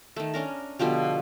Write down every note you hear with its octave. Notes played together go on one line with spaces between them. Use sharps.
D#3 A3
C#4 D4 A#4
B2 D3 F3 G3